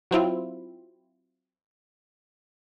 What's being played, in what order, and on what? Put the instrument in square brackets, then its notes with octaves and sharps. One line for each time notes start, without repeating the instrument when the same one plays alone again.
[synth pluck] F#3 C4 E4 F4